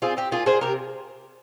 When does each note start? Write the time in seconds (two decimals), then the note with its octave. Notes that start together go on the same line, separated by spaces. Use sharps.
0.02 C4 F4 G#4
0.17 C4 G4
0.32 A#3 F4 G#4
0.46 A#3 G#4 C5
0.61 C3 G4 A#4